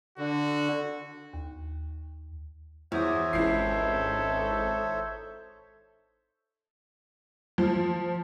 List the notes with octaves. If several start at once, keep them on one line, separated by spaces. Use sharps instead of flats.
D3 F#4
D#2
E2 F#4 C5 C#5 E5 D6 D#6
G#1 C#2 D#4 E4 A4 C7
F3